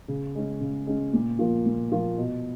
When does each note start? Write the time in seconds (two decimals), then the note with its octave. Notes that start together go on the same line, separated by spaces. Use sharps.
0.08 C#3
0.35 G#3 C#4
0.61 C#3
0.87 G#3 C#4
1.13 A#2
1.39 F3 A#3 F4
1.66 A#2
1.92 F3 A#3 F4
2.17 B2